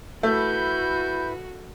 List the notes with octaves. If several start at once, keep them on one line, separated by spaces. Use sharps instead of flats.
A3 E4 F#4 B4 G6